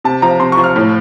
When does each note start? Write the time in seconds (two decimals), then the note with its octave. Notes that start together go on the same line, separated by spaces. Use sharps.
0.04 C3 A5
0.22 F3 A#5
0.40 C3 C6
0.52 F3 C#6
0.64 F6
0.76 A2